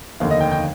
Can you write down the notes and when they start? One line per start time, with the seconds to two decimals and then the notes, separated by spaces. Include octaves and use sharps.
0.20 F1 D#2 D3 F5
0.31 D#5
0.40 G5
0.52 G5